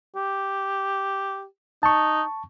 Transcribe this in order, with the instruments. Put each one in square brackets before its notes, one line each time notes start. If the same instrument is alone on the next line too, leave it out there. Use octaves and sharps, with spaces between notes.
[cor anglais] G4
[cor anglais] D#4 [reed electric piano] A5 C#6